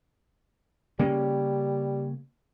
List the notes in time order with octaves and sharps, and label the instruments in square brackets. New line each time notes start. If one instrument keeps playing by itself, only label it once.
[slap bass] C#3 A#3 C#4 [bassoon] G3